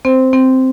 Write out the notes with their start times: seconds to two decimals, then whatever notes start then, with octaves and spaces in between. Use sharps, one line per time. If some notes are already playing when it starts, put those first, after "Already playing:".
0.05 C4 C5
0.33 C4